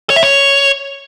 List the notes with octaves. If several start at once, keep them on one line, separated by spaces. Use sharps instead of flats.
C#5
E5
C#5